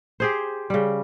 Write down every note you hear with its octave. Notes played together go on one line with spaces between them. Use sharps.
G4 G#4 C5
C#3 G3